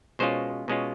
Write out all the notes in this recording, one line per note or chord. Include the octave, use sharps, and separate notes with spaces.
B2 G#3 C#4 F4 C5
B2 G#3 C#4 F4